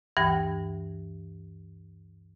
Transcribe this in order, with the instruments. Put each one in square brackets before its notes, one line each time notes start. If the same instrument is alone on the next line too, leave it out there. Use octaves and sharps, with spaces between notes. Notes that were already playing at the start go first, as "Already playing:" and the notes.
[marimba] D2 G2 E3 G5 A#6